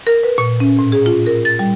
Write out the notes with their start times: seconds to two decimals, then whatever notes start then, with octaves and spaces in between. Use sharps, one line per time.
0.07 A#4
0.23 B4
0.38 A#2
0.60 C#4
0.79 A2
0.92 G#4
1.06 F4
1.26 A#4
1.45 A6
1.59 G3